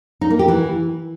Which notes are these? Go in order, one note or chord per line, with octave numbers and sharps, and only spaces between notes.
D#4
A#3
G4
E3